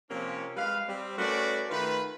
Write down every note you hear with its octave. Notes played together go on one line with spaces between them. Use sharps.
C3 F3 A#3 C#4
G3 G#3 B4 F5
G3 C4
A3 C#4 F#4 A#4 B4 D5
D#3 A3 F4 B4